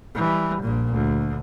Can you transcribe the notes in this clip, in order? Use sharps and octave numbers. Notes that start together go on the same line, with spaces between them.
E3 G3
A#1 A#2
D2